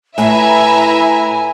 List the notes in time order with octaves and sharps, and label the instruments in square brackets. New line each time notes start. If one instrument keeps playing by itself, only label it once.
[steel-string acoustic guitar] A2 [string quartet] E4 B4 [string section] E5 A#5 [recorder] G#5